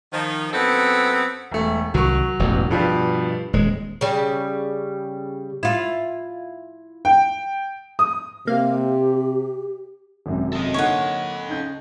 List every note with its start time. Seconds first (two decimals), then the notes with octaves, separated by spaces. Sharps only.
0.12 D#3 F3
0.52 F#2 B3 C4 A4
1.51 E1 A3
1.94 C2 D#3 F#3 C#6
2.39 E1 A1 E2
2.71 G2 B2 F3 G3
3.53 D#1 G#3
4.01 C#3 G3
5.63 E4 F4
7.05 G5
7.99 D#6
8.47 C3 A#3 G4 F5
10.26 G#1 F#2 C3
10.53 A4 D#5
10.74 D3 A#3 D#4 C#5 F#5
11.49 C#3 D#4 G6